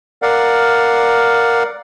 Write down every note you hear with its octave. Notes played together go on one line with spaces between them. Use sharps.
A#4 D5 F5 F#5